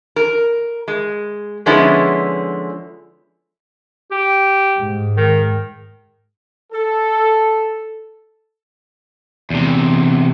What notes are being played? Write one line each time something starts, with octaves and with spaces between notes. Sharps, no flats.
A#4
G#3
D3 F3 G#3 B3 C#4 E4
G4
G#2
D#3
A4
E2 C3